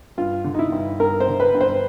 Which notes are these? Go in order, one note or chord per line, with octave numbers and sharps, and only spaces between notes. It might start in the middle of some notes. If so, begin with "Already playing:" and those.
G2 F4
D3
D#4
E4
G2
G2 A#4
C5
D3
B4
G2
C5